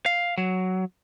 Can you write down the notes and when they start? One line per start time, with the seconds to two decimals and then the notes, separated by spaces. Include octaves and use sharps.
0.06 F5
0.38 F#3